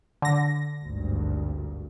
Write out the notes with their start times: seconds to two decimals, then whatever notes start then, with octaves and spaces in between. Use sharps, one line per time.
0.22 D3 A#6
0.82 G#1 D2 G2